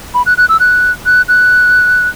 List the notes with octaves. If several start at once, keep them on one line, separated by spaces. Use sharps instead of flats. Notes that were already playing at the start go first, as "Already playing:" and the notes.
B5
F#6
F#6
E6
F#6
F#6
F#6